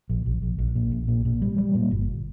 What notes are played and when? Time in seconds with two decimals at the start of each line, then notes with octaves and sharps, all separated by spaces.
0.10 A#1
0.26 A#1
0.42 A#1
0.59 A#1
0.76 A#2
0.92 A#1
1.08 A#2
1.25 A#2
1.41 G3
1.58 G3
1.75 A#2
1.91 G1